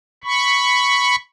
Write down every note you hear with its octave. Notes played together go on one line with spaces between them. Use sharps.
B5 C#6